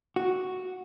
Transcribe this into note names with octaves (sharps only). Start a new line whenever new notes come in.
F#4